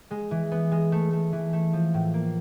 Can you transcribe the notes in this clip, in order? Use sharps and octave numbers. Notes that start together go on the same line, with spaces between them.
G#3
E3
B3
G#3
A3
A3
E3
A3
F3
A2
A#3